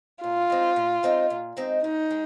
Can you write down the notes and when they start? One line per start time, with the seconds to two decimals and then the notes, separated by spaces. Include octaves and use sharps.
0.23 A#2 F4
0.50 G#3 C4 D#4
0.76 A#2
1.03 G#3 C4 D#4
1.30 A#2
1.57 G#3 C4 D#4
1.83 A#2 D#4
2.10 G#3